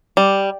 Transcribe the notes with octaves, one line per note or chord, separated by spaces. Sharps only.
G3